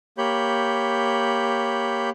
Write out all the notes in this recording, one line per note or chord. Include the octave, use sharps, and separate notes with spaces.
A#3 G4 C#5 B5 G6